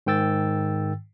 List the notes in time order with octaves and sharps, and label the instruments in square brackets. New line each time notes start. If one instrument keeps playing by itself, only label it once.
[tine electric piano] G#2 D#3 G5 E6 A6